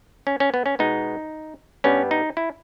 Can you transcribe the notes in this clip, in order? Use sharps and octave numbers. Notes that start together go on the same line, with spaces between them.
C#4
C#4
B3
C#4
B2 G#3 B3 D#4
G2 G3 B3 C#4
D#4
E4